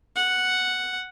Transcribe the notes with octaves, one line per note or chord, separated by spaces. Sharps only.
F#5